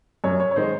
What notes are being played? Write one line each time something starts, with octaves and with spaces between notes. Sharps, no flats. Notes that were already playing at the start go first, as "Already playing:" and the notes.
F#2 C#5
C#5
C#5
D#3 G#3 C5